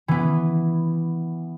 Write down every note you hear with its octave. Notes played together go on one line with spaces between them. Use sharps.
E3 B3